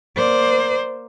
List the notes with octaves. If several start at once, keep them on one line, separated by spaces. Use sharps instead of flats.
A#3 C5 D5